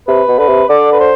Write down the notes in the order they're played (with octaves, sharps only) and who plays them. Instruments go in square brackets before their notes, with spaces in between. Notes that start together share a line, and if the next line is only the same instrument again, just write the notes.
[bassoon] C3 [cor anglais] B4
[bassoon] B2
[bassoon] D3 [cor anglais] B4
[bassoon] C3
[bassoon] D3 [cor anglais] D5
[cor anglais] B4
C5